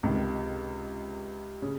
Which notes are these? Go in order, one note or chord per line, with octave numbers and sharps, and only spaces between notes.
C#2 C3 D#3
C#3